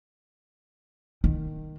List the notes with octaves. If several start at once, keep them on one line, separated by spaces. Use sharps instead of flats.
D#3